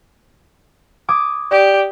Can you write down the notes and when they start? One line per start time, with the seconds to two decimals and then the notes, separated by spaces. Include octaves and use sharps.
1.09 D6 D#6 G#6
1.51 G4 D5